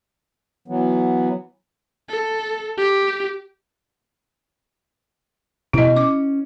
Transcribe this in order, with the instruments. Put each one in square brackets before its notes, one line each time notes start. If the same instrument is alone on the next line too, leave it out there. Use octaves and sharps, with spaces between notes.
[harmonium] E3 F#3 B3
[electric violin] A4
G4
[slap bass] B2 [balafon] E4 D#5
[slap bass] C#4 [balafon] D6